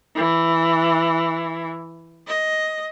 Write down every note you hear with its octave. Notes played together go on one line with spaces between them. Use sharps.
E3
D#5